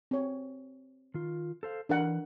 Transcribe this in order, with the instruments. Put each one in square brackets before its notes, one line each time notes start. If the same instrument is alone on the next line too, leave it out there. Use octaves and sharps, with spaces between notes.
[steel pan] C4 C#5
[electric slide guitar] D#3 F4
A4 C5 F5
[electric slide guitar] E3 [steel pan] D4 A#4 F#5